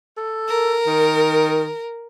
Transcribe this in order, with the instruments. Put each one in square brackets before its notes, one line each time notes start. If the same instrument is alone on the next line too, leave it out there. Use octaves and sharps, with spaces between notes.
[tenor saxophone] A4
[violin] A#4
[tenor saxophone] D#3